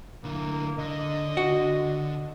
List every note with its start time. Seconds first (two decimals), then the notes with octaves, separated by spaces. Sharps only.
0.24 D3 A#3 E4
0.78 D3 D#5
1.37 F#4